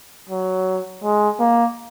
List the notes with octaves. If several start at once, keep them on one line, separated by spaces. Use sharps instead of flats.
F#3
G#3
A#3